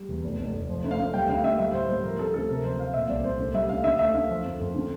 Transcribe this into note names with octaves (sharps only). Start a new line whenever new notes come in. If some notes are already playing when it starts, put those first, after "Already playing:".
Already playing: G3
E2
F1
F1
F1
F3
D2
F5
D2
G3 G5
D2 F5
D2 E5
G3 E5
A2 C5
G3 C5
F3 A#4
C4 A4
D2 A4
C3 A#4
F3 C5
F3 F5
A#2 E5
C2 D5
C2 C5
D2
G3 E5
D2 F5
D3 E5
A3 E5
D3 F5
F3
F2
F2
D3